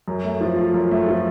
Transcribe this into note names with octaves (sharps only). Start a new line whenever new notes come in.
F#2
A3
F3
F4
F#2
A3
F3